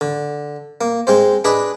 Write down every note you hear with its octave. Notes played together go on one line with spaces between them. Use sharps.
D3
A#3
G#3 C4 C5
D4 G#4 B4 D#5